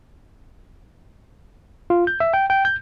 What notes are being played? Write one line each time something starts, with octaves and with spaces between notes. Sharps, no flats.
F4
G6
E5
G5
G5
G6